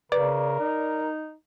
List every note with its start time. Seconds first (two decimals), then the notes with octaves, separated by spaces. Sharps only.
0.12 C#3 A#4 B4 D5
0.60 D#4